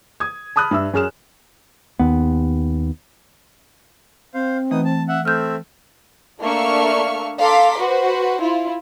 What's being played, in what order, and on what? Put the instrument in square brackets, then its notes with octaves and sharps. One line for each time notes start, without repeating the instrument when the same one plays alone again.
[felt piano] D#6 G#6
A5 B5 D#6 F6 F#6
G2 E5 E6
F#2 G#4 F6 E7
[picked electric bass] D#2 B3
[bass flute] C4 [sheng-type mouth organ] C5 F5
[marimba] E3 A3 [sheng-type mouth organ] B3 D#4 D#6
[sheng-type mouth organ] A5
E5 F#5
[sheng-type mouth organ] A3 C4 E5 [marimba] F6 G6
[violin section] A3 A#3 D4 E5 C#6 F6
A4 F5 A#5 C6 D6 B6
F#4 B4 C5
E4 F4